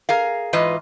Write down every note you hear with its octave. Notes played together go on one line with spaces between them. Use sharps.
G#4 A#4 F5
G#2 E3 F4 B4 D#5